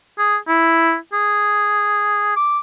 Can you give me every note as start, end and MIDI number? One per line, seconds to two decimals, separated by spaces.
0.18 0.37 68
0.48 0.96 64
1.13 2.32 68
2.36 2.59 86